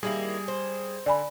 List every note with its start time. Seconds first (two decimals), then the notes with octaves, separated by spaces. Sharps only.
0.03 D#3 G3 A#3 E4 G#4
0.48 C5
1.06 D3 D5 G#5 B5